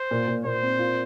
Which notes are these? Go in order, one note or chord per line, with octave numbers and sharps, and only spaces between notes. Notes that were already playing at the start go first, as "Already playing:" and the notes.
Already playing: C5
A#2
A#2
A#2 C5
C4
F4